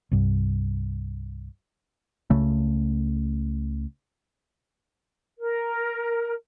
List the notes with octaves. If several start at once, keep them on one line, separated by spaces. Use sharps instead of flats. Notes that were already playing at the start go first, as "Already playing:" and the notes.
C2 G2
C#2 C#3 A3
A#4